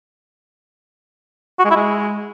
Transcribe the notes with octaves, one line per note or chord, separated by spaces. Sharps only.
F#4
G#3
E4
G#3